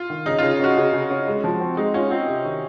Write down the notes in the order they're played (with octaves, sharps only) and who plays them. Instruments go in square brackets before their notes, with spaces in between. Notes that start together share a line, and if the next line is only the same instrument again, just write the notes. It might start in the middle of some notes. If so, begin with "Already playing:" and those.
Already playing: [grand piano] F4
[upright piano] D#3
[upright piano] C#3 [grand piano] D#4
[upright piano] C#3 [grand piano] F4
[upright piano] C#4 [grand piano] F#4
[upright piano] C#3
C#3
C#4
G#3
F3
C4
[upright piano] G#3 [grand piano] D#4
[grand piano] C#4 [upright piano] F4
[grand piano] C4 [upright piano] F4
[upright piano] C3
D#3